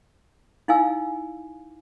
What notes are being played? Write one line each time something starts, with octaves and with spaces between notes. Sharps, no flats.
D#4 E4 F5 G#5 E6